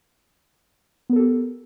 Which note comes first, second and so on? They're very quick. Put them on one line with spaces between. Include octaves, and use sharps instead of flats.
B3 A#4 A4 G4